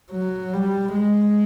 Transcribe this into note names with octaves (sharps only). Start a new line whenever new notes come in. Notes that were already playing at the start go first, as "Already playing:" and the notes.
F#3
G3
G#3